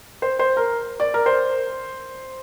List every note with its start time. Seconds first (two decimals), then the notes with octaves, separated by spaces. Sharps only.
0.22 C5
0.39 C5
0.57 A#4
1.00 D5
1.14 A#4
1.26 C5